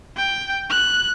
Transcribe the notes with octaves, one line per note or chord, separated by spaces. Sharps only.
G5
F#6